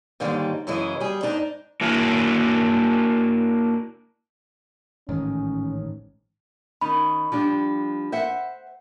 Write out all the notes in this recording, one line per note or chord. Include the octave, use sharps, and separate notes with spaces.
D#2 G#2 D3 D#3 G3 G#3
F#2 C#3 E3 G#3 E4
G3 G#4
G#2 D4 D#4
A#3 D4 E4 F#4 A#4
A1 G#2 D#3 C#4
D#3 C#4 D#4 B5
F3 G3 D4
C5 E5 F#5